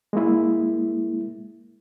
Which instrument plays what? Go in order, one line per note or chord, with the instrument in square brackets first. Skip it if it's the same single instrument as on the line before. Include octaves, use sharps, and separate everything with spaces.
[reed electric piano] G#3 A#3 E4